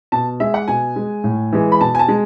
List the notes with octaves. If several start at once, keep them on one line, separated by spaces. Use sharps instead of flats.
B2 A5
G#3 E5
F#5
B2 G#5
G#3
A2
E3 G#3
B5
B2 A5
G#5
A5
G#3